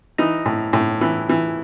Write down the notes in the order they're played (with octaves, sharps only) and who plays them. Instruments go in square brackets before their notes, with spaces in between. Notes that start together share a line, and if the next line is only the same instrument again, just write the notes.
[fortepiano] E3 D#4
A2
A2
E3
E3